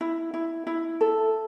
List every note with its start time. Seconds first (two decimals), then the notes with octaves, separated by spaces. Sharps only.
0.01 E4
0.34 E4
0.67 E4
1.01 A4